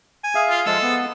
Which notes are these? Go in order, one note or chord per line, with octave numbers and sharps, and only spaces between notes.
G#5
G#4 E5 F5
F4
F3 G#3 A4
B3